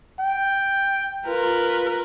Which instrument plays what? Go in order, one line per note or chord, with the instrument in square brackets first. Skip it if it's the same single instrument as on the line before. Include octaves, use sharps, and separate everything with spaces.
[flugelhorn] G5
[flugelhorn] F4 [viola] A#4 B4